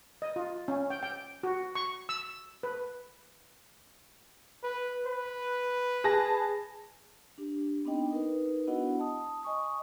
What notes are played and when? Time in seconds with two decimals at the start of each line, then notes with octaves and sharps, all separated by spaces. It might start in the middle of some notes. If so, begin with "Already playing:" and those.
0.22 D#5
0.36 F4
0.68 C#4
0.90 G5
1.03 G5
1.43 F#4
1.75 C#6
2.09 E6
2.63 B4
4.64 B4
5.07 B4
6.04 G#4 A5 A#6
7.38 D4 G4
7.85 B3 C4 D4 D#4 D#5 G5
8.11 D#4 A#4 B4
8.67 B3 D4 E4 F#4 D#5 F#5
8.99 A5 D#6
9.43 D#5 G#5 C#6 D#6